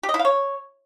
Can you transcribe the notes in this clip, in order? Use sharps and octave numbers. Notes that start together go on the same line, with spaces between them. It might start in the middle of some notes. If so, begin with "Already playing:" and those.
G4
D#5
E4
F5
C#5